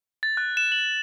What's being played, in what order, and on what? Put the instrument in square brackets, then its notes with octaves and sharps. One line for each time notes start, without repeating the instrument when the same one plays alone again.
[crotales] A6
F#6
E7
F#7